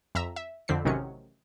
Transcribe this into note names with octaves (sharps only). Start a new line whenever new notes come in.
F2 E5 A#5 E6
E5
F2 D3 C4 B6 C7
A1 C3 D#3 F#3 C#4 C#7